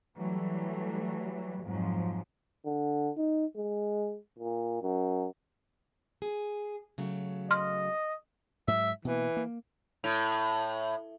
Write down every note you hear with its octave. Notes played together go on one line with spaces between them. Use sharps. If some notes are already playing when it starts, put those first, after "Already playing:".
E3 F#3 G3 A3
F2 G#2 F3 F#3
D3
D#4
G#3
A#2
F#2
G#4
C#3 F#3 A3
D#5 C6 F6
G#2 F#3 E5
B2 E3 A#3
A#3
A2